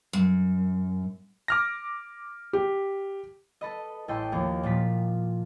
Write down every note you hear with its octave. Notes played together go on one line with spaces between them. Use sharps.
F#2
D6 F6 A#6
G4
A4 B4 D#5
A1 E4 A4 D#5 G5 C6
D#2 F3 A#3
A#2 F3 F4 B6